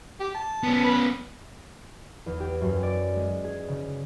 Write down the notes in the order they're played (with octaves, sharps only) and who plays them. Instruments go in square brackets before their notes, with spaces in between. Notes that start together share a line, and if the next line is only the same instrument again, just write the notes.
[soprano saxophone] G4
A5
[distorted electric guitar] B3 C#4
[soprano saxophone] B4
[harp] E2
G4
F#2
D5
G#3
G#4
C#3